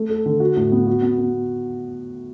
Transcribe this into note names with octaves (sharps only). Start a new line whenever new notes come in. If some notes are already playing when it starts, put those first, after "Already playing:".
Already playing: A3
A4
D3
F#4
A2
B3
F#4
B3
B3